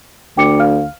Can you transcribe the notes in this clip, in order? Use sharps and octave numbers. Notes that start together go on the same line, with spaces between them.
D2 G5 D6 C#7
F5 F6